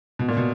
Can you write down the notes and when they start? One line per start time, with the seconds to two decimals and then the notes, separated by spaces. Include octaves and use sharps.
0.19 B2
0.28 A#2
0.37 B2